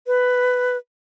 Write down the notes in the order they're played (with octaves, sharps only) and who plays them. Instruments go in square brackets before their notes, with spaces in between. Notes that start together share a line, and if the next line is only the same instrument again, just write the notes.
[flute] B4